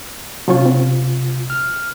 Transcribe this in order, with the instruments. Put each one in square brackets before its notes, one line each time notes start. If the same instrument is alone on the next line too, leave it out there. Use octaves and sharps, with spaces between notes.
[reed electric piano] C3 F4 [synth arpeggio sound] F#3 C#4 C#5
[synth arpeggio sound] C4
[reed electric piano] F6